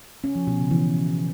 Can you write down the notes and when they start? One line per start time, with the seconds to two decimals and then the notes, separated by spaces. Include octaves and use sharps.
0.24 C#4
0.36 F3
0.47 B2
0.59 C#3
0.71 E3